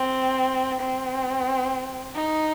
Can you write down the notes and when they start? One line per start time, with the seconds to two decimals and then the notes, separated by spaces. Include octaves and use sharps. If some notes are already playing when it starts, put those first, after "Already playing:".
Already playing: C4
0.80 C4
2.15 D#4